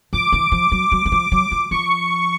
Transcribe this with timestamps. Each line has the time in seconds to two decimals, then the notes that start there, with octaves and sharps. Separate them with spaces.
0.13 F3 D6
0.32 E3
0.52 F3
0.72 F#3
0.92 F#3
1.06 E3
1.12 F3
1.32 F#3
1.51 F3
1.71 F3 C#6